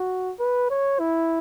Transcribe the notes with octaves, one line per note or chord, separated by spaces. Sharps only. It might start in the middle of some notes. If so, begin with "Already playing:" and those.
Already playing: F#4
B4
C#5
E4